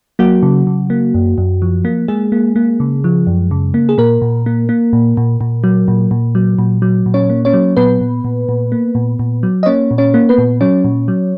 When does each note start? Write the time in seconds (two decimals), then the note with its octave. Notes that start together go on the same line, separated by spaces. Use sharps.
0.19 F#3 A#3 F#4
0.43 C#3
0.67 C#3
0.90 A#3
1.14 F#2
1.38 F#2
1.62 F3
1.85 A#3
2.08 G#3 A#3 G#4
2.32 A#3
2.56 A#3
2.80 C#3
3.04 F3
3.27 F#2
3.51 C#3
3.74 A#3
3.89 G#4
3.98 A#2 A#3 A#4
4.22 A#2
4.46 A#3
4.69 A#3
4.93 A#2
5.17 A#2
5.41 A#2
5.64 F#3
5.88 A#2
6.11 A#2
6.35 F#3
6.58 A#2
6.82 F#3
7.06 A#2
7.14 C#4 C#5
7.30 A#3
7.45 C#4 C#5
7.53 F#3
7.77 A#2 B3 B4
8.01 A#2
8.24 A#2
8.49 A#2
8.72 A#3
8.95 A#2
9.19 A#2
9.43 F#3
9.63 D#5
9.66 A#3 C#4 C#5
9.91 A#2
9.98 C#4 C#5
10.14 A#3
10.29 B3 B4
10.38 A#2
10.61 F#3 C#4 C#5
10.84 A#2
11.08 F#3